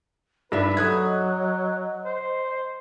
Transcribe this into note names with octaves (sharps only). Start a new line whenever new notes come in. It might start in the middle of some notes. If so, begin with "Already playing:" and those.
G2 D#4 B4 D5 E5
F#3 A4 D#6 F#6 G#6
D#5
C5